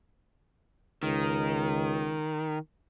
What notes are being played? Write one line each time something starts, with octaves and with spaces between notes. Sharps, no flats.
C#2 D#3